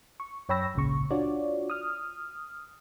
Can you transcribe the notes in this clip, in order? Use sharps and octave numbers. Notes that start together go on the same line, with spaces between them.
C#6
F#2 C#5 G5 B5 E6 A#6
G#1 C#2 A#2 C#3 C#6
D4 F4 F#4 C#5 D5
D#6 F6